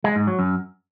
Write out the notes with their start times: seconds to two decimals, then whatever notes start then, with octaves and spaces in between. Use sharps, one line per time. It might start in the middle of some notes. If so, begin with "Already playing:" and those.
0.04 G#3
0.16 G#2
0.27 F#3
0.39 F#2